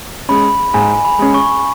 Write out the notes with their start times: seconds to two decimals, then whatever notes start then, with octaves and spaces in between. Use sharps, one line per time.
0.29 G#3 C#4 B5
0.74 G#2 G#5
1.05 B5
1.19 G#3 C#4
1.34 C#6